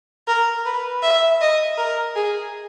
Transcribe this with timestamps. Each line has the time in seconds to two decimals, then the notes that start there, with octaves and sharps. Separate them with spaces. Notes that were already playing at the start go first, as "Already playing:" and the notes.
0.28 A#4
0.66 B4
1.03 E5
1.41 D#5
1.78 A#4
2.16 G#4